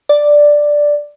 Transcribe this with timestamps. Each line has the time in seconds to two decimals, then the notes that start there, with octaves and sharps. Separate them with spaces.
0.09 D5